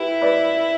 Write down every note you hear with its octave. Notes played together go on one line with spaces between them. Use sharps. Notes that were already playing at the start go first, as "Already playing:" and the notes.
Already playing: E4 G4 B4
B4 D5